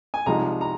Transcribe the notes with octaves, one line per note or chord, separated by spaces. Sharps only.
G#5
C2 C3 F3 G#3 D#4 A#5
A#5